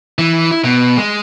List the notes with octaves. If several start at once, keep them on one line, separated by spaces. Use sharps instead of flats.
E3
E4
B2
G#3